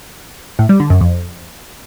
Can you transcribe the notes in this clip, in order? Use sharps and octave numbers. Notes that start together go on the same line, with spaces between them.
A2
G3
D3
F#2
F2